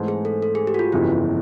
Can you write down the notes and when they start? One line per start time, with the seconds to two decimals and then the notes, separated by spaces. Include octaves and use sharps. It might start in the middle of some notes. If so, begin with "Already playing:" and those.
Already playing: G#2 E3 A3 C4
0.08 G#4
0.25 A4
0.42 A4
0.55 G#4
0.67 G4
0.74 F#4
0.79 F4
0.92 G1 F2 C#3 E3 E4